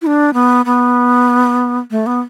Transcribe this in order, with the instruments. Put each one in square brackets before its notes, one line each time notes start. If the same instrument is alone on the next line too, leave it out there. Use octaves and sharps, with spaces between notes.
[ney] E4
D4
B3
B3
A3
B3